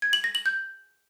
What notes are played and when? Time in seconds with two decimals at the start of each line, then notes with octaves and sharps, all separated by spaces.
0.02 G#6
0.13 F#7
0.24 A#6
0.35 F#7
0.46 G6